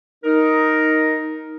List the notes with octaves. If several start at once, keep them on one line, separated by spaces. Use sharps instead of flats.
D#4 A#4